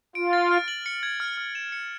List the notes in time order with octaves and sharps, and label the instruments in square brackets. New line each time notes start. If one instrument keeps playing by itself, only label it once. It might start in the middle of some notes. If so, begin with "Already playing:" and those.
[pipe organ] F4 [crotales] D7
[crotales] A6
F6
F#7
C#7
G#6
F6
F6
E7
C#7